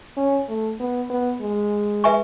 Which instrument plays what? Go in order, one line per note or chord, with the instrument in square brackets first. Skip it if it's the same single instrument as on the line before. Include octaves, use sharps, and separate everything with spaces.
[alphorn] C#4
A3
B3
B3
G#3
[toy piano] B4 E5 G#5 C#6